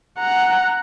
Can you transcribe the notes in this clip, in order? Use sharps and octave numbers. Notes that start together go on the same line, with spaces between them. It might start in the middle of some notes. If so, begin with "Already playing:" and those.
F#5 A#5